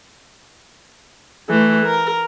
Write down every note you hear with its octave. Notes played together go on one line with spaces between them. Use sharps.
E3 A3
A#4